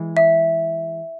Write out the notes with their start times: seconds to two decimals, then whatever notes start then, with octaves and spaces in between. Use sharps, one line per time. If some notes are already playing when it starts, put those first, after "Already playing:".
Already playing: E3 G#3
0.17 E5